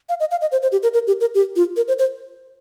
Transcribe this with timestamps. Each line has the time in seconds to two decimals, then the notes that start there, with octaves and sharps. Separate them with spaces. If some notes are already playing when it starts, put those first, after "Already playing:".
0.09 F5
0.20 D#5
0.31 F5
0.41 D#5
0.52 C5
0.62 C5
0.72 G4
0.83 A#4
0.94 A#4
1.07 G4
1.21 A#4
1.35 G4
1.56 F4
1.77 A#4
1.88 C5
1.99 C5